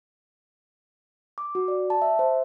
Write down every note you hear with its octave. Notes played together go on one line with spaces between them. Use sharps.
D6
F#4
D5
A5
E5
C5